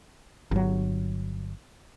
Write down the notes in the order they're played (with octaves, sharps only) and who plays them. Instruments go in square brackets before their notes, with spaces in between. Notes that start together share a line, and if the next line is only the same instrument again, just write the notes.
[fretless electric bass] G1 F#3